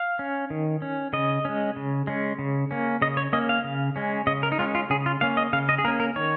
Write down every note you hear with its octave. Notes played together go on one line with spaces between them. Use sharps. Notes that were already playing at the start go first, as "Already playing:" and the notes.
Already playing: F5
C#4
D#3
C#4
C#3 D#5
G#3 C#4
C#3
G#3 C#4
C#3
A#3 C#4
C#3 D#5
C#5
A#3 C#4 D#5
F5
C#3
G#3 C#4
C#3 D#5
A#4
D#4
G#3 C#4 F4
F4
C#3 G#4
F4
A#3 C#4 F5
D#5
C#3 F5
D#5
G#4
A#3 C#4 A#4
A#4
D#3 C#5